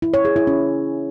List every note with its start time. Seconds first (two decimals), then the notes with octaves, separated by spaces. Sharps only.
0.02 E4
0.14 C#5
0.25 G#4
0.36 E4
0.47 C#4